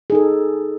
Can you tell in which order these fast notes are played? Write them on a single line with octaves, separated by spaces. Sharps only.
G#4 D#4 A4